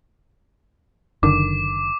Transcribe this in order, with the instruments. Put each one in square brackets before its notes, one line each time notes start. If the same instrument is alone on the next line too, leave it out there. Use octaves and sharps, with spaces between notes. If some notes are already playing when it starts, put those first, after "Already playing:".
[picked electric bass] F#1 D3 D#3 [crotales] D6